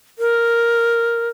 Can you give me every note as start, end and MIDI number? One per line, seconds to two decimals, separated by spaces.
0.18 1.28 70